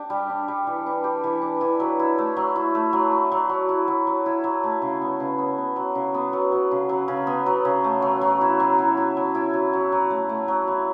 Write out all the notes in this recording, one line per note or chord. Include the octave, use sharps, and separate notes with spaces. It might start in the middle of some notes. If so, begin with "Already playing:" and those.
Already playing: D4 G4
G3
D4
G3
E3
D4
G4
E3
D4
E3
F#3
E4
A3
F#3
E4
A3
F#3
E4
F#3
F#3
E4
F#3
F#3
E4
F#3
A3
C#3
B3
C#3
B3
B3
F#3
C#3
B3
F#3
F#3
C#3
F#3
C#3
B3
F#3
C#3
A3
F#3
F#3
E4
F#3
E4
E4
F#3
E4
F#3
F#3
F#3
A3
A3
F#3
E4